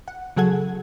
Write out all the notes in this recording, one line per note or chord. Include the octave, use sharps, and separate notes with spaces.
F#5
C#3 F#3 G#4 A4 F#5 G#6